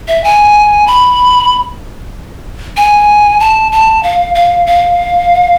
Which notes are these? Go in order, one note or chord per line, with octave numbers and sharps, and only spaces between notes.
E5
G#5
B5
G#5
A5
A5
F5
F5
F5